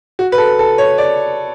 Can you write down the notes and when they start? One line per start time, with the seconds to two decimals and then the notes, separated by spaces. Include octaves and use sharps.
0.19 F#4
0.32 B4
0.38 A4
0.59 A4
0.78 C#5
0.98 D5